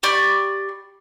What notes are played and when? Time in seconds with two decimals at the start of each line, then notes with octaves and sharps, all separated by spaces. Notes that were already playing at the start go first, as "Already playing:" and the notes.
0.03 G4 D5 B5 C#6